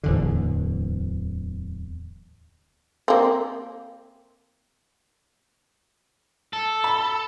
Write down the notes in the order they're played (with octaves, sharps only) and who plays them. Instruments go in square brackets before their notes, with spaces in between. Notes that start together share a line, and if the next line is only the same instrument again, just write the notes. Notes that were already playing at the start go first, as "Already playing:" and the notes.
[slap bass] D1 E2 D3
[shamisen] A#3 C4
[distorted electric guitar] A4
[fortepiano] B5